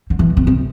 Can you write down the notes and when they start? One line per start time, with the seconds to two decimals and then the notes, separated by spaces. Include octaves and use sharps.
0.10 D3
0.19 E3
0.37 C3
0.47 C3